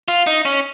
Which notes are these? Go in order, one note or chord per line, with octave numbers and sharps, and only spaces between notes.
F4
D#4
C#4